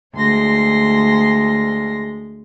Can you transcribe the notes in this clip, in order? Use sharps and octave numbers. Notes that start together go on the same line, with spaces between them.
D2 G#3 C6 A#6